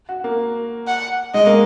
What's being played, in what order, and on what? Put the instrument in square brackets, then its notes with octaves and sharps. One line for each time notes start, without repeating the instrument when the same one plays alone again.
[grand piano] F#4
A#3
[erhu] F#5
[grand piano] G#3 [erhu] D#5
[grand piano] A#3